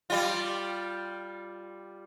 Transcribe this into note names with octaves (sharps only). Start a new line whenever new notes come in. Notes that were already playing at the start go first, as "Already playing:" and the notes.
G3 F4